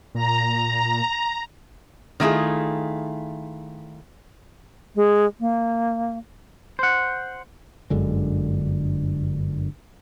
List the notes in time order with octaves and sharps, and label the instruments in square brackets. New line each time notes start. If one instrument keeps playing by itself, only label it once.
[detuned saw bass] A#2 [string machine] A#5
[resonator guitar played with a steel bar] D#3 A3 E4 F4 G#4
[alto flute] G#3
A#3
[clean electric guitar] C5 F#5
[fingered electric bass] G1 F#2 D3 G#3